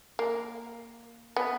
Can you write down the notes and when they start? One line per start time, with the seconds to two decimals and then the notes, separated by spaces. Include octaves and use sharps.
0.19 A#3
1.36 B3